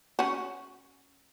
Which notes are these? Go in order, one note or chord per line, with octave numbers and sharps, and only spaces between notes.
C#4 F#4